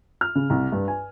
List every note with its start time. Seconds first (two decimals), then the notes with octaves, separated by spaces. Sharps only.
0.21 F6
0.35 C#3
0.50 C2
0.72 G2
0.88 G#5